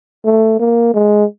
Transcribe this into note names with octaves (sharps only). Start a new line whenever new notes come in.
A3
A#3
G#3